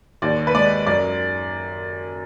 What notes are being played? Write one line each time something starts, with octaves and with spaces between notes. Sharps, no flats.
D#2 D5
B4
G#3 D5
F#2 D5